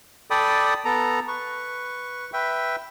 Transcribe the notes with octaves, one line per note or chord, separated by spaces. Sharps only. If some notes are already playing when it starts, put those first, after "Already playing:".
A4 D5 G5 B5 D#6
B3 A4 A#5
B4 C#6
B4 E5 G5